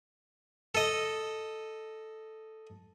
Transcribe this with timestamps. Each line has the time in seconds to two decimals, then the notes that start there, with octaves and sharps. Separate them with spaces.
0.75 A4 D#5